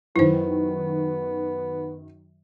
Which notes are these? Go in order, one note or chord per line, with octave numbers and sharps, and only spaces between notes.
F#2 D#3 B3 E4 C5